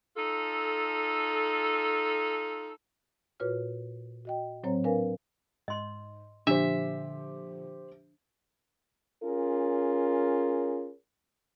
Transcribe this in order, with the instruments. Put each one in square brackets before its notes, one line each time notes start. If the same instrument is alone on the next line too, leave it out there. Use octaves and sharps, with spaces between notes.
[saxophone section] D#4 F4 A4
[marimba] A#2 F4 F#4 B4 C#5 F6
F#4 D#5 G5
A2 F#3 C4 C5 C#5 A#5
D4 A#4 B4 F5 G#5
[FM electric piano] G#2 [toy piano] D#5 C6
[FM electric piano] A#2 D3 F3 [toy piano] D4 [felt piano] G4 C5 [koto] E5
[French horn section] C#4 F4 G#4 A#4